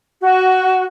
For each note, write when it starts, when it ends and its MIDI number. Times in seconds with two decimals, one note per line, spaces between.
0.22 0.84 66